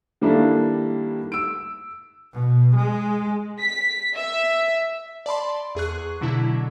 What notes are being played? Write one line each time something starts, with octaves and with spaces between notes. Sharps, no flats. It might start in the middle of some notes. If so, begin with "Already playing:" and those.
D#3 G3 A#3 D4 E4 A4
E6 D7
B2
G#3
B6
E5
D5 A5 B5 C6
E2 G#4 C#6 F#6
B2 D3 F#3 E4